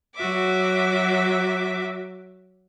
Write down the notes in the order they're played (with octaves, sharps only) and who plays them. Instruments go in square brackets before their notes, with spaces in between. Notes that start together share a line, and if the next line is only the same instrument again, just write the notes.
[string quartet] F#3 F#4 E5 D6